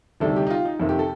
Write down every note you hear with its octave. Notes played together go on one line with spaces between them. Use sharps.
D2 C3 D#3 G3 A4
G4
D#4
F4
D#4
F2 C3 D#3 A#3
G4
A4